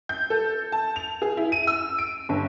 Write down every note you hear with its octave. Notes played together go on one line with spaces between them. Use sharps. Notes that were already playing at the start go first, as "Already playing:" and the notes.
G6
A4
A5
F7
G#4
E4
D#7
E6
D7
G1